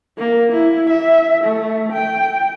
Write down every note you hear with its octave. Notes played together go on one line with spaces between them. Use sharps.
A#3
E4
E5
A3
G5